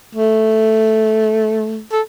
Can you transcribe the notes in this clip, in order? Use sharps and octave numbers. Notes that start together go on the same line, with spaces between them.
A3
A4